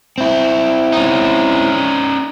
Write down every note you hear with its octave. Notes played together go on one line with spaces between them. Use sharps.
C4 E4
C#4 D#4